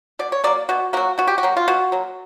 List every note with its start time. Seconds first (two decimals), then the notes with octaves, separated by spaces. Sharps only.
0.19 B2 D5
0.32 C#5
0.44 F#3 A#3 D5
0.69 B2 F#4
0.93 F#3 A#3 F#4
1.18 B2 F#4
1.27 G4
1.38 F#4
1.43 F#3 A#3
1.57 F4
1.68 B2 F#4
1.92 F#3 A#3